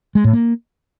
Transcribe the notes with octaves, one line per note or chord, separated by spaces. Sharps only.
G#3
A2
A#3